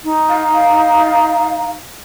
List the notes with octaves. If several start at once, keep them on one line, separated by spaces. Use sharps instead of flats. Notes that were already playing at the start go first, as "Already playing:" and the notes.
D#4
F5